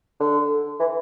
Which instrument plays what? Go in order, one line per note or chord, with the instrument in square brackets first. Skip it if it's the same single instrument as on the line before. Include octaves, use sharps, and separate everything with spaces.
[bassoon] D3
E3